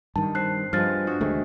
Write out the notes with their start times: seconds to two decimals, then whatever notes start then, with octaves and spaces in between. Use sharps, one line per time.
0.16 G2 D#3 A5
0.35 C4 F#6 C7
0.73 G2 F3 G#3 B3 F6 A6
1.07 D4 F#4 E5
1.21 D2 C3 D#3 G#3 A3 G#4